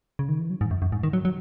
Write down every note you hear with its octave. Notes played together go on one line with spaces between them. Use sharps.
C#3
D#3
E3
F#3
G#2
F#2
F#2
G#2
D#3
F#3
F#3